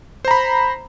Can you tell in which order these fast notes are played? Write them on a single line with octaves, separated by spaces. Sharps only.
C5 A#5 B5